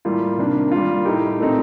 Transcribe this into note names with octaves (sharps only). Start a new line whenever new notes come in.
A2 G3 A#3 F4
C3 D#3 A#3 D4
G3 A#3 F4
A2 A3 D#4 G4
A#2 A3 C4 D#4